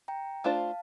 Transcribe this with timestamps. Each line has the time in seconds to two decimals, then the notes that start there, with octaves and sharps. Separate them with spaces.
0.08 G5 A#5
0.44 A3 D4 F4 C5 F5 A5